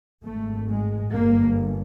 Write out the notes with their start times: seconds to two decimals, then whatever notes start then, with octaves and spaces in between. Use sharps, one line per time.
0.24 G#1 G#2 A3
0.68 G#3
1.12 G1 G2 A#3